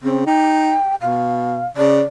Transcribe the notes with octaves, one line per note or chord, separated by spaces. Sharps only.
C#3 C4
D#4 G5
B2 F5
C#3 D5